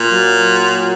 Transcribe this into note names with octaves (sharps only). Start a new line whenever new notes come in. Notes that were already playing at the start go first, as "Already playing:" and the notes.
Already playing: A#2
F#3